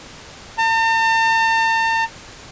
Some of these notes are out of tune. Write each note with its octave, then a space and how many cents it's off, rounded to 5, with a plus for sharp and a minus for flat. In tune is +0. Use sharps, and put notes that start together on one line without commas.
A5 +45